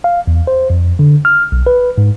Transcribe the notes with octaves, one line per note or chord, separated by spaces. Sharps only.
F5
E2
C5
F2
D3
F6
B1
B4
G#2